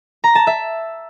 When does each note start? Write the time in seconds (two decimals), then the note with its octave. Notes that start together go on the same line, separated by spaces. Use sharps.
0.24 A#5
0.35 A5
0.47 E5